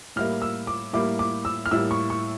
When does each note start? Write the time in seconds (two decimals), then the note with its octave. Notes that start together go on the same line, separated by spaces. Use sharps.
0.16 A2 G3 A#3 E4 F6
0.42 E6
0.67 D6
0.93 A2 G3 A#3 E4 D6
1.19 D6
1.45 E6
1.66 F6
1.71 A2 G3 A#3 E4 E6
1.91 C#6
2.10 C#6